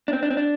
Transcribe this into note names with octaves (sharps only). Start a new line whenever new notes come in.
D4
C4
D4
C4
D4